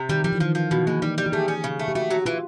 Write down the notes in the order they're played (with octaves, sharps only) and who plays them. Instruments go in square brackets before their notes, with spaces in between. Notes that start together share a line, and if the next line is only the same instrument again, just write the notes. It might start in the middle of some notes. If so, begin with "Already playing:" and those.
Already playing: [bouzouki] C3
[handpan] D#3 [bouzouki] G3
[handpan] F3 [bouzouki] G3
[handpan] E3
[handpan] D#3 [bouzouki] F3
[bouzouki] F3
[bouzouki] B2 [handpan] E3
[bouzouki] G#3 [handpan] A#3
[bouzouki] G3 [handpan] D#4
[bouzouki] G3
[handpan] G4
[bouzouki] A3 [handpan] G#4
[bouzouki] C#4
C#3
A3
[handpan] G4
[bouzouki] A3 [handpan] F#4
[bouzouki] F#3
[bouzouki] E3 [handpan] F4